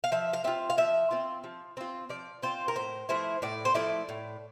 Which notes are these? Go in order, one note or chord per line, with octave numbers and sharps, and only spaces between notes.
F5
F3 E5
F5
C4 F4 E5
F5
F3 E5
C4 F4
F3
C4 F4
F3 D5
C4 F4 C5
A#4
A2 C5
F3 A3 E4 C5
A2 D5
C5
F3 A3 E4 D5
A2